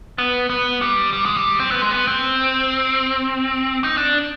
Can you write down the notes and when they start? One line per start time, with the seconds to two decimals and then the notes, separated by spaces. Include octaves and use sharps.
0.18 B3
0.50 B3
0.81 G3
1.13 G3
1.25 G#3
1.37 G3
1.60 C4
1.71 B3
1.82 G#3
1.91 B3
2.07 C4
3.84 D#4
3.97 D4